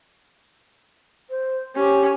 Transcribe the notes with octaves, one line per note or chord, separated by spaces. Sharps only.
C5
C#4 G4